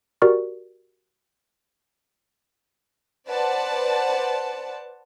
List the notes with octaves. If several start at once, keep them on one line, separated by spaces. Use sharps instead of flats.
F#4 G4 A#4 D5 C#6 F6
B4 C5 D5 F#5 A5